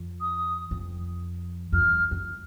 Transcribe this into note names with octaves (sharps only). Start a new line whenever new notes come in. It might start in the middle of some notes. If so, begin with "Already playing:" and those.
Already playing: F2
D#6
F2
F2 F6
E2
F2